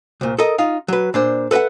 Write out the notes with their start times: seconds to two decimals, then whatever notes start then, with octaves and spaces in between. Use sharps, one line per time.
0.21 C2 A#2
0.38 A4 A#4 D#5
0.58 D#4 F4 F5
0.88 F#3 B4
1.14 A#2 D4 C5
1.51 A4 B4 D#5 E5 F#5